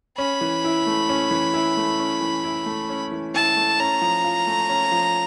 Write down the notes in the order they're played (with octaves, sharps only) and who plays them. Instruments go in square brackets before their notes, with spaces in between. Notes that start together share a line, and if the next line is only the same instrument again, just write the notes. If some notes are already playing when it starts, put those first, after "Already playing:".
[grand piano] C#4 [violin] B5
[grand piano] E3
E4
A3
C#4
E3
E4
A3
C#4
E3
E4
A3
C#4
E3
[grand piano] E4 [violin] A5
[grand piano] A3
[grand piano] C#4 [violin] A#5
[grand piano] F3
F4
A3
C#4
F3